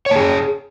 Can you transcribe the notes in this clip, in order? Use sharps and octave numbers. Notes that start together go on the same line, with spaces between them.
G#4 C#5 A5